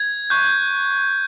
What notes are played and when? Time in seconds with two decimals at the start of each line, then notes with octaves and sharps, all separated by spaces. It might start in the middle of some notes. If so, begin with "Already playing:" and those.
Already playing: G#6
0.30 C#6 F#6 G6